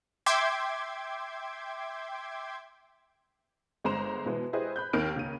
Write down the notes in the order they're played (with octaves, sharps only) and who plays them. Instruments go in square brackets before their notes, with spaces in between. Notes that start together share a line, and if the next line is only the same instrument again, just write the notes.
[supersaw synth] E5 G5 C6 D6 G#6
[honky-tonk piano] G1 G#3 C5 A#5 C6 E7
B2 E3 G#3 B3
E4 G4 G#4 B4 C5 D#5
B5 F#6 G6
D#2 D#3 G5 F6 D7
C#2 C#3 A#3 C#4 D#7